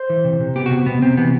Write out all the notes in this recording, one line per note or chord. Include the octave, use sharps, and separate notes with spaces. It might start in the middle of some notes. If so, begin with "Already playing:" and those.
Already playing: C5
E3
C3
C3
B3 G4
F#4
C3
C3 B3
C3 C4
E3 B3